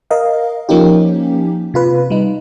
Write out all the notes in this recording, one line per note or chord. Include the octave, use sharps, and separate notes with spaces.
A#4 D#5 F5
F3 A#3 C#4 D#4 G4
C3 F4 B4
G3 D#4